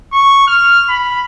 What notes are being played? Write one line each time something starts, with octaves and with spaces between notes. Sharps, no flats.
C#6
F6
B5